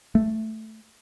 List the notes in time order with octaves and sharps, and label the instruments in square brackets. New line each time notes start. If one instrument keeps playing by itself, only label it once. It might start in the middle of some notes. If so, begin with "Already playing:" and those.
[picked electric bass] A3